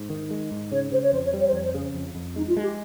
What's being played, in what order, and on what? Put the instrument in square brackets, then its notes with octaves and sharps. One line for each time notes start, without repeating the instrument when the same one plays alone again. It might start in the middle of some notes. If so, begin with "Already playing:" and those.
Already playing: [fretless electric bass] G#2
D#3
G#3
G#2
[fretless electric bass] C#3 [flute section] C#5
[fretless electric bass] C#3 [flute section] C5
[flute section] C#5
[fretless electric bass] F2 [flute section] C5
[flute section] C#5
[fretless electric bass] G3
[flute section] C#5
C5
[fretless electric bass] F2 [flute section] C#5
[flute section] C5
[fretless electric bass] C#3 [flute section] G#4
[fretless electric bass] F2
F2
[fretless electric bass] G#3 [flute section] D#4
[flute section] F4
[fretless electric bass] G#3
[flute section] G4